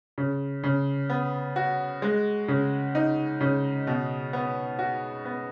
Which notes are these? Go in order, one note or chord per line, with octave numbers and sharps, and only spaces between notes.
C#3
C#3
B3
F#4
G#3
C#3
D#4
C#3
B2
B3
F#4
B3